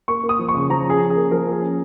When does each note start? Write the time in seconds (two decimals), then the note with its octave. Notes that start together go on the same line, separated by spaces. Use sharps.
0.08 A#3 C#6
0.23 A#3
0.29 D#6
0.39 F3
0.49 C#6
0.54 C#3
0.70 F3 A#5
0.85 C#4 G#4
1.00 C#4
1.10 G#4
1.16 A#3
1.31 F3 A#4
1.47 A#3
1.52 G#4
1.62 C#4